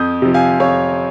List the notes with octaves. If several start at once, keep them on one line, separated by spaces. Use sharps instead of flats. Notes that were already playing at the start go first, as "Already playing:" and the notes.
Already playing: F2 D#6 G6
C3 F3
F5 G#5
F2 C#5 F5